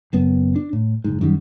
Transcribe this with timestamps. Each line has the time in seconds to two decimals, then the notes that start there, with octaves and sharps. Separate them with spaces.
0.13 F#1 F#2 B3
0.56 D4
0.73 A2
1.04 F#1 G#2
1.21 F#2 D#3 F#3 G3